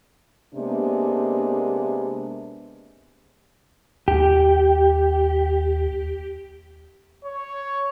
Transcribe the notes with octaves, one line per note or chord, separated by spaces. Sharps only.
C3 G#3 A#3 B3 D4
D#2 G4
C#5